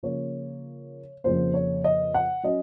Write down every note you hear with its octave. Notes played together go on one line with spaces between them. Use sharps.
C#3 F3 A#3 C#5
F2 C#3 F3 A#3 C5
C#5
D#5
F#5
F#3 C#4 D#5